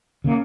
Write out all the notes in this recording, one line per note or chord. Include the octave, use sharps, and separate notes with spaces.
C#3 A#3